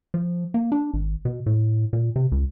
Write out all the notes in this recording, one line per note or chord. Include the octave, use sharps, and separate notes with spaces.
F3
A#3
D4
G#1
B2
A2
A#2
C3
C#2